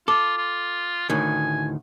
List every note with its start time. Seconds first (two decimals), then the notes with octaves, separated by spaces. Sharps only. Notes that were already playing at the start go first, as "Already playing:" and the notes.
0.08 F4 A4 D6
0.37 F4
1.10 D2 A2 D#3 G#5